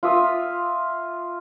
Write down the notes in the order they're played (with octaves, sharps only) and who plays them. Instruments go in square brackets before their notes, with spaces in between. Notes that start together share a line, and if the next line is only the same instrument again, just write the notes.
[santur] F4 E5 D#6 E6